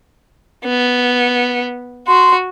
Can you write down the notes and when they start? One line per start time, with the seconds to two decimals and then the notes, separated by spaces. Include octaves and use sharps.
0.64 B3
2.08 F#4 C6